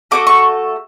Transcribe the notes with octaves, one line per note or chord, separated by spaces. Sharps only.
A3 C#4 F#4 A4 D6
C#6